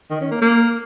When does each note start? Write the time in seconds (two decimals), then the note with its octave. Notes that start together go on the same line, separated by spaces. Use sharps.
0.10 D#3
0.21 C#4
0.31 A#3
0.41 A#3